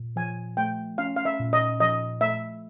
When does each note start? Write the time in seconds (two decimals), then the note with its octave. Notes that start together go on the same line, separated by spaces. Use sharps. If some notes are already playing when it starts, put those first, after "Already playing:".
Already playing: A#2
0.16 F3 G#5
0.57 A3 G5
0.98 C#4 F5
1.16 F5
1.25 E5
1.40 A#2
1.53 D#5
1.80 F3 D#5
2.21 A3 E5